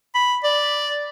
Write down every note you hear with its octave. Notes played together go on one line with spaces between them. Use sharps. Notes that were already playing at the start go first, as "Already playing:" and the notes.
B5
D5